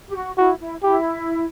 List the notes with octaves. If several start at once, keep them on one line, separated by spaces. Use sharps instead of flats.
G4
F#4
E4 F#4
E4
E4 G4